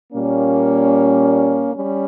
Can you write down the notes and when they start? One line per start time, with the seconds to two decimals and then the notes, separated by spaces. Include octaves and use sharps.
0.12 A#2 G3 A#3 C#4
1.74 G3 C#4